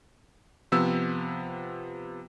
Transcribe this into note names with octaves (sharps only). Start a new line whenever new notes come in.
C3 F3 B3 E6